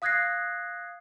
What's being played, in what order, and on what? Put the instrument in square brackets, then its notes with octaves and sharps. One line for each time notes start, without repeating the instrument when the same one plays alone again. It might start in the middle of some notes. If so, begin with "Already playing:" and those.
[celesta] F5 D#6 F#6 G#6 A#6 C7